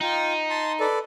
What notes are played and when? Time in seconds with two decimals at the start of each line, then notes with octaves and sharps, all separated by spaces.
0.01 D#4 F4 G5
0.50 A5 C6
0.80 A4 B4 D5